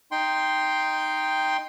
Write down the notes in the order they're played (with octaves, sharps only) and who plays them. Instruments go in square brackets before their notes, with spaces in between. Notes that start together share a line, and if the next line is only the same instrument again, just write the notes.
[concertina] D#4 G5 C6